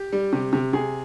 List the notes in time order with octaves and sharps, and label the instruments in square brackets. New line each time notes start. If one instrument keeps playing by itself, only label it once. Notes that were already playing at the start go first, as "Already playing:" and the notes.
Already playing: [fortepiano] G4
G3
C3
C3
C3 G#4